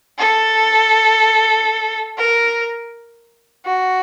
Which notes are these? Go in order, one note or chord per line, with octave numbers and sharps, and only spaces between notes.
A4
A#4
F#4